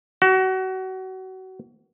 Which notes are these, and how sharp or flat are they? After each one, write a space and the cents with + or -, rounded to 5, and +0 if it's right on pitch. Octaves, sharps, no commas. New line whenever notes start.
F#4 +30